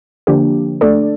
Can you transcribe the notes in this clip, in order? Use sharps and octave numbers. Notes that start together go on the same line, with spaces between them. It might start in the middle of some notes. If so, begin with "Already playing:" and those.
D3 F3 A#3 D4 G4
A3 D4 A4 D5